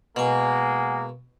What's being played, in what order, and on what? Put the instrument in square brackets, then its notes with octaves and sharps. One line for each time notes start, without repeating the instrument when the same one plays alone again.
[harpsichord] B2 [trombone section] G#3 A#3 [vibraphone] F#5 G#5